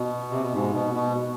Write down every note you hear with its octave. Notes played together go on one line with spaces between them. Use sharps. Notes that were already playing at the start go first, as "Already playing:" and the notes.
Already playing: B2
C3
B2
G#2
B2
B2